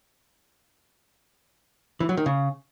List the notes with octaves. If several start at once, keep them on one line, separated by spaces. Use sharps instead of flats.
E3
F#3
D#3
C#3